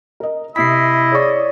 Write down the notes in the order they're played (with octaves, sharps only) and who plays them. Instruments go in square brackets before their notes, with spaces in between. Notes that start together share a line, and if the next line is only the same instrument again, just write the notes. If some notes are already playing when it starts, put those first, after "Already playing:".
[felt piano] A#4 D#5
[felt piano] C3 B5 [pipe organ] E4 [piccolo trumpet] D#5 [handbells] B6 C7
[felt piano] G#4 C#6 [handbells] C#5 D5